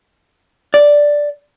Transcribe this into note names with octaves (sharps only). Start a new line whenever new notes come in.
D5